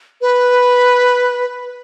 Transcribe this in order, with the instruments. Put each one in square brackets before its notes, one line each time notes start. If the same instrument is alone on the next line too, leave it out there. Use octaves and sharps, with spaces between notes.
[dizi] B4